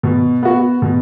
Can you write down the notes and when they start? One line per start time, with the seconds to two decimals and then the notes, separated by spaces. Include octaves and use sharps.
0.03 B2
0.43 B3 F#4
0.82 B2